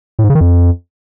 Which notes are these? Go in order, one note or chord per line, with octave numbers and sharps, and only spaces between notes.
A2
G#2
C#3
D#3
F2